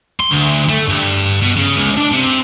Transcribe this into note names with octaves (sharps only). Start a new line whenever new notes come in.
C6
D2
A3
G2
B2
C#3
C#2
D4
C3